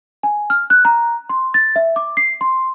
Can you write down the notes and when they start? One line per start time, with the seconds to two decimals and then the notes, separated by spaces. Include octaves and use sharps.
0.23 G#5
0.50 F6
0.70 F#6
0.85 A#5
1.29 C6
1.54 A6
1.76 E5
1.96 D6
2.17 C7
2.41 C6